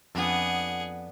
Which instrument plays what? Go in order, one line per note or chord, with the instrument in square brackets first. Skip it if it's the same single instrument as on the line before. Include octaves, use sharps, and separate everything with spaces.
[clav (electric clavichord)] F2 [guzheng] B3 D4 A4 [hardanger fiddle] G#4 F#5